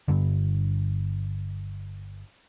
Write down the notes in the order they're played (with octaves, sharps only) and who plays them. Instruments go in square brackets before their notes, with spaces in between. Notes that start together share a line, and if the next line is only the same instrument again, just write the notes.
[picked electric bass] G1 G2 D3